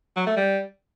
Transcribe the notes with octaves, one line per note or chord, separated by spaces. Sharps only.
F#3
A3
G3